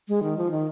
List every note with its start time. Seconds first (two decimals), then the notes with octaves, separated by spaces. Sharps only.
0.08 G#3
0.23 D#3
0.37 F3
0.51 D#3